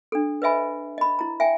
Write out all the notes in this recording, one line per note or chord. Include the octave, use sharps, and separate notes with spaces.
D4 A4
B4 C5 D#5 E5 G#5 B5
D#5 B5
E4 A#5
E5 G5 G#5